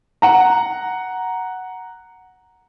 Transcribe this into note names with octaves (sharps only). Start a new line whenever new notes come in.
F#5 A#5